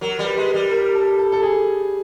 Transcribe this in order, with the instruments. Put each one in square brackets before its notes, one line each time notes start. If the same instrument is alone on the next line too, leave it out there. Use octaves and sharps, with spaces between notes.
[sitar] F#3 [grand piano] A#4
[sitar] G3
[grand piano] B4
[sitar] G#3 [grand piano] B4
[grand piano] A#4
[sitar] G3
[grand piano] A#4
A#4
A4
A4
A4
G#4